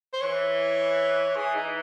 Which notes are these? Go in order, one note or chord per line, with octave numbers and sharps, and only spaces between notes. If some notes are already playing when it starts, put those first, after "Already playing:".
C5
E3 C#5
E3 G#4
D#4